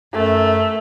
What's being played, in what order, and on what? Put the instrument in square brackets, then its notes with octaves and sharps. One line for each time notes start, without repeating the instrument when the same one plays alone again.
[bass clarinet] F#2 [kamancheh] A3